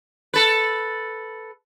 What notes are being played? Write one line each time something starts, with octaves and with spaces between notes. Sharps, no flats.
A4 B4